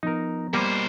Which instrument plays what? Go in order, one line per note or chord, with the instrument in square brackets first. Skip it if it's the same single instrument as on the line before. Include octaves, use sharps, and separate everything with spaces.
[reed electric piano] F3 B3 A#5 [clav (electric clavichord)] D#4 A#4
[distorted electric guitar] B2 C5 [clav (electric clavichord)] G3 A#3